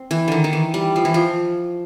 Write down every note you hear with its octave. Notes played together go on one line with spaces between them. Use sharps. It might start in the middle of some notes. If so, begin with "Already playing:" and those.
Already playing: C4
E3
D3 D#3
D#3
E3
G3
F3
E3
F3